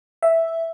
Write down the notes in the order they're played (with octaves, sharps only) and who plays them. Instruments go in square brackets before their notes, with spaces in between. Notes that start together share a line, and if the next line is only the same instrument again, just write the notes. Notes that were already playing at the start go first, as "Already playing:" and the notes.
[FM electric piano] E5